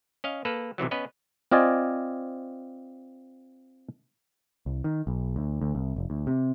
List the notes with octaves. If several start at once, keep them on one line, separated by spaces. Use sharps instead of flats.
C#4 D#5 F5
A#3 A4 B4
B1 C3 E3 F#3
B3 C#4 B4 D#5
C4 F4 D5 D#5 G#5
C2
D#3
B1
D2
D2
C2
F1
D2
C3